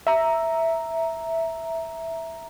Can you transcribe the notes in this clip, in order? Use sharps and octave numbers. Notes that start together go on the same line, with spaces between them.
E5 A#5